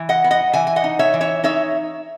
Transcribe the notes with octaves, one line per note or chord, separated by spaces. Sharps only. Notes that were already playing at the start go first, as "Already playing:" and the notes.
Already playing: E3
D#5 F#5
B3
D#5 F#5
E3 E5 G#5
G#5
D#5 F#5
D#4
C#5 E5
E3
C#5 E5
D#4 C#5 E5